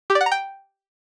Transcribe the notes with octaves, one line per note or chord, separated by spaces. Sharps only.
G4
D5
F#5
A#5
G5